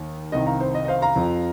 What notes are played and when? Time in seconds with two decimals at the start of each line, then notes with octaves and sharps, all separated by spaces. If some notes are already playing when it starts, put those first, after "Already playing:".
Already playing: D#2 D#3
0.32 C2 C3 D#3 D#5
0.46 F5 A#5
0.60 C5
0.75 D#5
0.85 D#5
0.88 C5 F5
1.02 F5 A#5
1.16 F2 F3